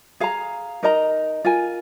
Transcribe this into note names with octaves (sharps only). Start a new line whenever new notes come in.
G#4 F5 A#5
D#4 A#4 D#5 A#5
F4 A#4 G#5